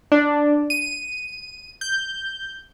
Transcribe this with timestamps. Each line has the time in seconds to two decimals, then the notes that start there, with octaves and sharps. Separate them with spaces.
0.12 D4
0.70 D#7
1.81 G6